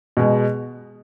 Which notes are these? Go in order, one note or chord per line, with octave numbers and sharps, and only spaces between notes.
B2 G#3